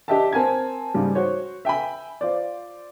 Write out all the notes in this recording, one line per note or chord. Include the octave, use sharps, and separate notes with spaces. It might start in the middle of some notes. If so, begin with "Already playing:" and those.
D4 G4 D#5 E5 G5 A5
C4 A#4 G#5 A5 G#6
G#2 C#3 G3
F#4 C5 C#5
E5 G5 G#5 B5
F4 C5 D5